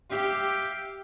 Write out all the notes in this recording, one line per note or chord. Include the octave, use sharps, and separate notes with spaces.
G4 E5 F5 G5